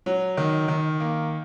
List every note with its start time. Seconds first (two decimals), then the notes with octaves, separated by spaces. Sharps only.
0.06 F#3
0.37 D#3
0.68 D#3
1.00 A#3